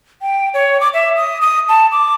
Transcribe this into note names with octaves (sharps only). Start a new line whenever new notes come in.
G5
C#5
D6
E5
D#6
D#6
A5
D6